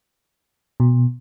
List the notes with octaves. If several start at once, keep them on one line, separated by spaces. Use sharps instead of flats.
B2